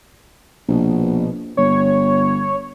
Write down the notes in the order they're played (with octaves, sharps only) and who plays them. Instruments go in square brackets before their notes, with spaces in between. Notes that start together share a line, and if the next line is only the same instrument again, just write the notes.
[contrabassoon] A#1 [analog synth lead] B2
[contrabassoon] G1 [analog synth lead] C#5